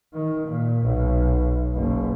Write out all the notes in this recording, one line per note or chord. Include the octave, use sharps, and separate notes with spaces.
D#3
A#2
B1
F#1 B2